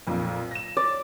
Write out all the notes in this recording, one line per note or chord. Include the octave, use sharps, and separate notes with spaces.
B1 F2 A#2
A#6 E7
D5